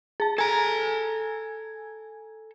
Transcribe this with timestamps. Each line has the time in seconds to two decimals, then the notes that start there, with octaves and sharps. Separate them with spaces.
0.20 G#4 A5
0.38 A4 G#5 A#5 G#6